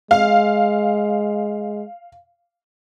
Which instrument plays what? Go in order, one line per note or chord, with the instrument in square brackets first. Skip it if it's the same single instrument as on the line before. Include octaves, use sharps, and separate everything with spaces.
[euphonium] G#3 [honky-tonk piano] F5